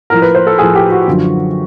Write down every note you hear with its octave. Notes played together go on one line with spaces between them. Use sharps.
A2 F3 A#4
B4
C5
A4
A2 F3 G#4
G4
F#4
F#2 D3 F3